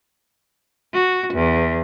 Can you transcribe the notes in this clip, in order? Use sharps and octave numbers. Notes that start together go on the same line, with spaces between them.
F#4
E2